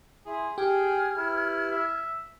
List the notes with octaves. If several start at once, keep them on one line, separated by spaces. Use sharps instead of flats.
E4 G#4 C6 D#6
G4 G#4 G5 F6 G#6
E4 B4
E5